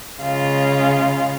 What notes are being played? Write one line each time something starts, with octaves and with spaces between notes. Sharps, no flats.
C#3 G#3 F4